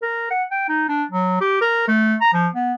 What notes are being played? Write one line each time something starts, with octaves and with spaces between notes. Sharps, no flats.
A#4
F#5
G5
D#4
D4
F#3
G4
A#4
A3
A#5
F3
B3